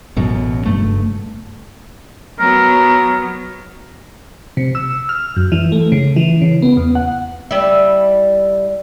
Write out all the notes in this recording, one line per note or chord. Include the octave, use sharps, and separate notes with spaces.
A1 F#2 B2
F#1 G2 A3
F#3 B3 A#4
C3
E6
F6
F#2
E3
A3
C#3
E3
C#3
B3
E2
F#5
G3 E4